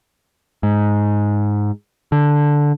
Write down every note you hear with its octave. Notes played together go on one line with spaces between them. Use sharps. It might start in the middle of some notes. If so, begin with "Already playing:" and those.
G#2
D3